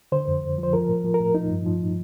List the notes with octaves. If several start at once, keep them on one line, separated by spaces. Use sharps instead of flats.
D3 C5
F2
F2
F3
C5
F3 A#4
A2
F3
A#4
A2
F3 D#4
G2
F3